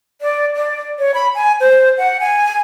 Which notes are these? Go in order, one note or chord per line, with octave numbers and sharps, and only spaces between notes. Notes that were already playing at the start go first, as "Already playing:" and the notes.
D5
D5
C#5
B5
G#5
C5
F#5
G#5